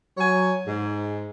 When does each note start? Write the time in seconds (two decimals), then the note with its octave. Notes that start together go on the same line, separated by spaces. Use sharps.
0.18 F#3 C#5 G#5
0.66 G#2